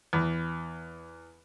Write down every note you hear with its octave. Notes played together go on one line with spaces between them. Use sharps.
E2